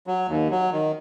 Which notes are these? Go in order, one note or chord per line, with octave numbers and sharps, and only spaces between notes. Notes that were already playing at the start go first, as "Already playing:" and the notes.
F#3
D#2
F#3
D#3